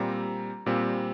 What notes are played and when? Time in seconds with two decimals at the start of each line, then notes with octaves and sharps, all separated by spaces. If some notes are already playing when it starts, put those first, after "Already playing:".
Already playing: A#2 G3 C4 A#5
0.66 A#2 G3 C4